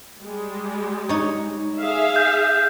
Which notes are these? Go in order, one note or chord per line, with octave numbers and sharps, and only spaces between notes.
G3 G#3
D#4 C#5
G#4 E5 F5
G6